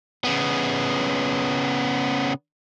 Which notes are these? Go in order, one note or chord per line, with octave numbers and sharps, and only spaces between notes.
C#3 B3